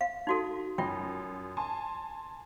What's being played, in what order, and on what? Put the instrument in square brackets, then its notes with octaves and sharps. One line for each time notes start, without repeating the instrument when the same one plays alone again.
[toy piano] F5
D#4 F#4 A4
[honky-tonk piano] F#2 [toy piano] F4 G5
[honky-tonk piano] G#5 A5 C6